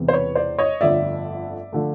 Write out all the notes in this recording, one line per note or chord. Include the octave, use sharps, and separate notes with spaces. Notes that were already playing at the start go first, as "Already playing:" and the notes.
Already playing: E1 E2 C3 E3
C5
B4 C#5
C5 D5
C#5 D#5
G1 F2 D3 F3 A3 D5 E5
D3 F3 A3